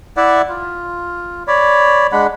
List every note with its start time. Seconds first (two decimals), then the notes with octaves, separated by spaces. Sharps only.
0.17 E4 D5 E5 F#5
0.49 F4
1.47 C#5 D5 B5
2.12 G#3 D4 F#5 B5